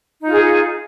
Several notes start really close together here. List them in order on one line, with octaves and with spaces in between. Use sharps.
D#4 F4 G#4